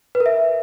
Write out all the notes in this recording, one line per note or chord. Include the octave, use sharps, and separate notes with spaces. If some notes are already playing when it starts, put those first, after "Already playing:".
B4
A#4
E5